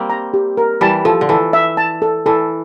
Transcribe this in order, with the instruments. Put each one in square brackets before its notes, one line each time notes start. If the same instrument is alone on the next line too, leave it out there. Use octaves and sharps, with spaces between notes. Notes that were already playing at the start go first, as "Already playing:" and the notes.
Already playing: [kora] G3 A#3 C4
[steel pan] A#5
G4
A#4
[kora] E3 G3 [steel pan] A5
[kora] F3 [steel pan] A4
[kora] D3
[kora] E3 [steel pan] A4
[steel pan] E5
A5
A4
[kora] E3 [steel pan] A4